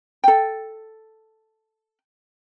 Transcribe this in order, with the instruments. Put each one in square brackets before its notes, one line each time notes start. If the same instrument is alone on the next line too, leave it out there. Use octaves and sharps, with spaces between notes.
[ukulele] A4 G5